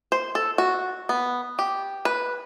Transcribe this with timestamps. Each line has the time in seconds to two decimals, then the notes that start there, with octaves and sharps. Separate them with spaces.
0.12 C5
0.35 A4
0.58 F#4
1.09 B3
1.59 G4
2.05 B4